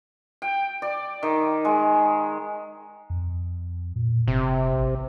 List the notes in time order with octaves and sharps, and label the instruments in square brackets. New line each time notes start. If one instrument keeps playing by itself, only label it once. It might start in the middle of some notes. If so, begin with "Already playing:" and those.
[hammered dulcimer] G5
D5
D#3
G#3
[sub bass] F2
A#2
[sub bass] F#1 [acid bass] C3
[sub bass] A1